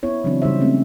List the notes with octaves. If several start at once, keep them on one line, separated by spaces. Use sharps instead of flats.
B3 E4 C#5
C#3 E3 F#3 C4 D4
C#3 G3 B3 D#4 C5 E5
G#3 A3 C4 C#4